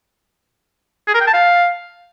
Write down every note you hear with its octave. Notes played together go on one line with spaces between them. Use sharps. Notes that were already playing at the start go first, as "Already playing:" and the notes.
G#4
A#4
G5
A5
F5